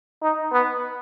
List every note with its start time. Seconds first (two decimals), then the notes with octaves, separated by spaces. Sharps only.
0.22 D#4
0.52 B3